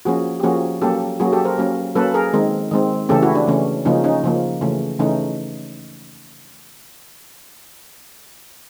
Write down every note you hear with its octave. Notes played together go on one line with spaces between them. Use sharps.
F3 A#3 C#4 F#4 G#4
G4
F3 A#3 C#4 F#4 G#4
F#3 A#3 C#4 G4 A4
F#3 A#3 C#4 F#4 G#4
G4 A4
A#4 C5
F#3 A#3 C#4
F#3 A#3 C#4 A4 B4
G#4 A#4
D#3 G#3 C4
D#3 G#3 C4
C#3 E3 A3 C#4 G4 A4
E4 F#4
D4
C#3 E3 A3 C#4
C#3 F3 A#3 C#4 D#4
C#4 D#4
C#3 F3 A#3
C#3 E3 A3 C#4
C#3 E3 A3 C#4 D#4